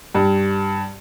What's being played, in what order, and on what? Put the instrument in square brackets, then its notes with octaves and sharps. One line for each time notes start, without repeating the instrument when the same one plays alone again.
[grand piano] G2